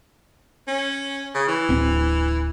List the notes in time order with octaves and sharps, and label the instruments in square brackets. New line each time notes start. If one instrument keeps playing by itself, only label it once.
[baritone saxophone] C#4
C#3
E3
[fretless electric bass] D1 C4